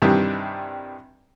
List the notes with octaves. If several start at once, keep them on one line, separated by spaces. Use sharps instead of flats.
G2 C3 D#3 E3 G3 D4